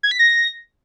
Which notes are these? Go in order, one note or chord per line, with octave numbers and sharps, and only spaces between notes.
G#6
B6
A#6